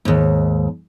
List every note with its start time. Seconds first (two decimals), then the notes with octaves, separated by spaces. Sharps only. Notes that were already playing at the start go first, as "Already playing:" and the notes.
0.05 D#2 G#2